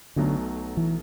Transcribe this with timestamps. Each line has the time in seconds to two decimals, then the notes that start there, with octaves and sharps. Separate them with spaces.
0.16 B1 B2 D3 F#3 A3
0.77 E3